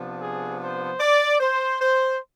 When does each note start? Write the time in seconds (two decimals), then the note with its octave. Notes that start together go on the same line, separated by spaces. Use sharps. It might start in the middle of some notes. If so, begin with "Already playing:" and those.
Already playing: C3 F3 B3 D4
0.20 G#4
0.60 C5
1.00 D5
1.40 C5
1.81 C5